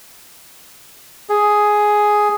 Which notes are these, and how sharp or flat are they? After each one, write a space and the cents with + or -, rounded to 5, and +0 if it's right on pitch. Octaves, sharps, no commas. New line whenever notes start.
G#4 +5